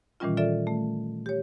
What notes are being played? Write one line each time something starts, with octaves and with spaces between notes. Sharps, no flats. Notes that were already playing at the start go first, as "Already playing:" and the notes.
A#2 D#3 E3 G3 C#4 F4
F4 A4 D5 E5
A3
G4 C#5